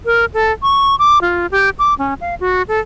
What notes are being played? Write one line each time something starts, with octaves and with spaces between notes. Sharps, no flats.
A#4
A4
C#6
D6
F4
G4
D6
C#4
F5
F#4
A4